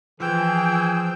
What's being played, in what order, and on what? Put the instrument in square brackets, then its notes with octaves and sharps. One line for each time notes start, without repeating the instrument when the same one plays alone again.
[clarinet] E3 [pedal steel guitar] F3 [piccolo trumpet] G#4 [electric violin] G5 E6